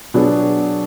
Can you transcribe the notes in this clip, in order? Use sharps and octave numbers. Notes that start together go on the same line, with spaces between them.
B2 F#3 B3 D4 G#4